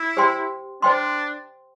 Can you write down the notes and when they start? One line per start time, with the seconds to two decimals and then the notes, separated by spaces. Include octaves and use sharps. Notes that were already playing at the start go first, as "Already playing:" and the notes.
Already playing: E4
0.17 G4 C5 G5 C6
0.82 D4 C5 G5 C6